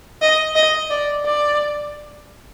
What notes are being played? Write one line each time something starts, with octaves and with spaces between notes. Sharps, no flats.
D#5
D#5
D5
D5